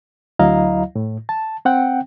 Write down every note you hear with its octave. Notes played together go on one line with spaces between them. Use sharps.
D2 F#3 E4 D#5 F5 A#5
A2
A5
C4 F#5 G5